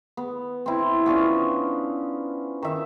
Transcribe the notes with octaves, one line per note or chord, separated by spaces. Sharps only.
B3
C4 E4
B3 C#4 D4 F4
D#3 E5